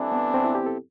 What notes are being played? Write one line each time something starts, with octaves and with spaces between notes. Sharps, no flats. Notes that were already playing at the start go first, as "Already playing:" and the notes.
Already playing: G2 E3 A3 C4 D4
B3
C4
E4
G4
A4